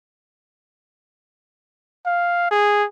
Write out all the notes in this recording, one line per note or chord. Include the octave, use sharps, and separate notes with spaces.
F5
G#4